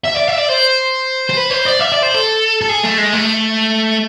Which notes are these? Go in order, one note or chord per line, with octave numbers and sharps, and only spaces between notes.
E5
D5
E5
D5
C5
C5
B4
C5
D5
E5
D5
C5
A4
A4
G#4
A3
G#3
A3